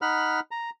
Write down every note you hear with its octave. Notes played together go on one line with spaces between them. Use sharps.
D#4 F#5 B5 F6
A#5